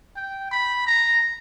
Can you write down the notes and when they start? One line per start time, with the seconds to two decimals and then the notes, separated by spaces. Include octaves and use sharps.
0.16 G5
0.51 B5
0.87 A#5